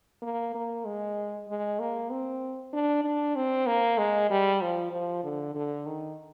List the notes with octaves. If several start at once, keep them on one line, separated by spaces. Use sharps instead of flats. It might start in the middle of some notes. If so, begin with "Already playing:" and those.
A#3
A#3
G#3
G#3
A#3
C4
D4
D4
C4
A#3
G#3
G3
F3
F3
D3
D3
D#3